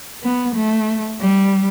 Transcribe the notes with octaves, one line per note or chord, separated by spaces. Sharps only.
B3
A3
G3